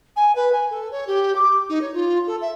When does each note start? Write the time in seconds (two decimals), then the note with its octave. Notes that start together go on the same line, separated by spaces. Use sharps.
0.16 G#5
0.35 B4
0.53 G#5
0.71 A4
0.91 C#5
1.07 G4
1.36 D6
1.69 D#4
1.82 C#5
1.94 F4
2.27 A4
2.41 E5